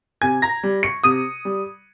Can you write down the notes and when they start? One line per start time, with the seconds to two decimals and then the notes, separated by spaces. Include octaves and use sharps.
0.22 C3 G#5 G#6
0.42 A#5 A#6
0.63 G3
0.83 C#6 C#7
1.04 C3 D#6 D#7
1.45 G3